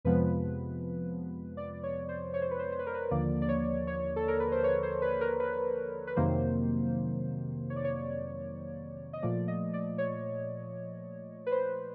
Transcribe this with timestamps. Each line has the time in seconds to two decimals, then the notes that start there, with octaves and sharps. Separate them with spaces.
0.05 F2 C3 F3 G#3 B3 B4
1.57 D5
1.83 C#5
2.09 C5
2.34 C#5
2.42 C5
2.51 B4
2.59 C5
2.72 C5
2.79 B4
2.86 A#4
2.94 B4
3.11 D#2 D3 F3 A#3 D5
3.42 D5
3.49 C#5
3.87 C#5
4.16 A4
4.28 A#4
4.40 B4
4.52 C5
4.64 C#5
4.83 C5
5.02 B4
5.21 A#4
5.40 B4
6.07 B4
6.16 F2 C3 D#3 F#3 A#3 C5
7.70 C#5
7.76 D5
7.84 C#5
9.13 D#5
9.22 A#2 F3 A3 D5
9.48 D#5
9.74 D5
9.98 C#5
11.47 B4
11.52 C5